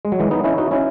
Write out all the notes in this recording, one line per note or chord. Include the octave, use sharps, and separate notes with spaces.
G#3
F#3
E3 G#3
B3 D#4
C#4 E4
D#4 F#4
C#4 E4